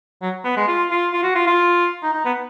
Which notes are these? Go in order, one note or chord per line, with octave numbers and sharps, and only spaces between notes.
F#3
B3
G#3
F4
F4
F4
F#4
F4
F4
D#4
D#4
B3